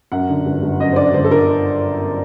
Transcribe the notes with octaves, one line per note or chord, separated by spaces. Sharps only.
F#2 F#5
D3
G1
G1
F#2 D#5
C5
D3 D5
G1 C5
A4
D3 A#4